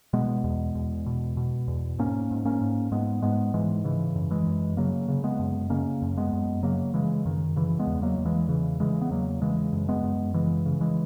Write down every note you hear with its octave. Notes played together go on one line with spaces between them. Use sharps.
B2 G#3 B3
E2
E2
B2
B2
E2
G#2 A#3 C#4
G#2
A#3 C#4
G#2
G#2 G#3 B3
G#2 G#3 B3
G#2 E3 G#3
C#3 E3
F#2
E3 G#3
F#2
C#3 F#3 A#3
C#3
G#3 B3
F#2
C#3 A#3 C#4
F#2
G#3 B3
F#2
C#3 F#3 A#3
C#3 E3 G#3
F#2 D#3
C#3 E3
G#3 B3
E2
F#3 A#3
E2
E3 G#3
C#3 E3
C#3 E3 G#3
B3
E2 F#3 A#3
C#3 E3 G#3
F#2
G#3 B3
F#2
C#3 E3 G#3
C#3
E3 G#3